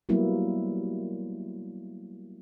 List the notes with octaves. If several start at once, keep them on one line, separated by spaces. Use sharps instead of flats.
F#3 G3 A#3 B3 E4